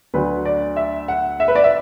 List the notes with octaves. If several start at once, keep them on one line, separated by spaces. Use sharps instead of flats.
D2 D3 F#3 B4
D5
E5
F#5
E5
B4
D5
E5